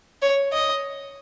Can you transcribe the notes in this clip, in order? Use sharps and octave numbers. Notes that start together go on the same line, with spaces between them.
C#5
D#5